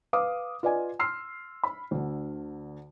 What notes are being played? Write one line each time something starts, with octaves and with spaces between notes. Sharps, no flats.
B4 F5 D6 D#6
F4 B4 D5 D#5 G#5
C6 E6 F6 C7
B5
D2 D3